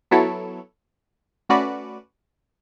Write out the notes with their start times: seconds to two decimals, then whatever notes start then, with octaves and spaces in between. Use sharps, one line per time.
0.11 F#3 B3 E4 A4 C#5
1.49 A3 C#4 F#4 B4 D5